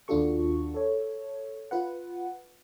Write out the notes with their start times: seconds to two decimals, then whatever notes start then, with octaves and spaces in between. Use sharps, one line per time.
0.08 D#2 D4 F4 F#4 A4 C#6
0.74 A4 C#5
1.71 F4 B4 F#5